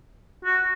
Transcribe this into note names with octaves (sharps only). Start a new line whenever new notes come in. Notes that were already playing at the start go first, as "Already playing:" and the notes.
F#4